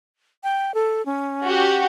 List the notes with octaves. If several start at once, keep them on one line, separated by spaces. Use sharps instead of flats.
G5
A4
C#4
F#4 G4